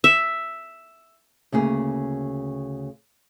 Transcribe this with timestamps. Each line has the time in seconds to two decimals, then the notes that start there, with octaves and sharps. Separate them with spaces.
0.04 E5
1.52 D2 C#3 A#3 G#4